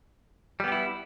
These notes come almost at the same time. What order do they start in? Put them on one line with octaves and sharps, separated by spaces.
G3 B3 G4 E4